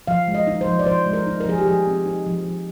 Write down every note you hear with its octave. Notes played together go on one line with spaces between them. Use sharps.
F3 F5
G#3
D#5
D#4
C5
F3
D5
F3 C5
G#3
A#4
D#4
A#4
F3 G#4
G4
F3 G#4
C4
D#4
F3
F3